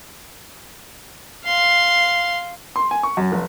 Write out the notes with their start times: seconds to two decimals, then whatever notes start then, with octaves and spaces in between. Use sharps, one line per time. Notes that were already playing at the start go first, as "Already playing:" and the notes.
1.45 F5 C6
2.76 C6
2.91 G#5
3.03 C#6
3.17 F#2
3.32 F1